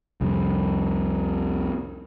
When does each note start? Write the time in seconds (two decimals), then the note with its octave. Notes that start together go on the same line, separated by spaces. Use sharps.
0.21 C2 F2